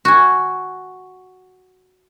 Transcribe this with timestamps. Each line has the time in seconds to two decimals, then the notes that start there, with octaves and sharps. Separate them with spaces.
0.05 F#4 G#5